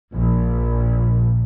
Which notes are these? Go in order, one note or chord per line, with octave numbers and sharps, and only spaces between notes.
A#1